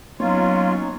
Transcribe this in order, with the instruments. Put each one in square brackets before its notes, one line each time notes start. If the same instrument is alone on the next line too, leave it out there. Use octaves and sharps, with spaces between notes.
[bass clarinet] F#3 [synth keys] A#3 B3 [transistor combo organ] C#4 D#4 C#5 [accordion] F4